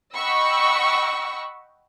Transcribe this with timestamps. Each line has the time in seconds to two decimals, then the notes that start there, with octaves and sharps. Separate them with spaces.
0.16 D#5 F#5 G5 B5 C#6 E6